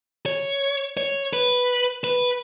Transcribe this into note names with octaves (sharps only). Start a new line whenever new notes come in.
C#5
C#5
B4
B4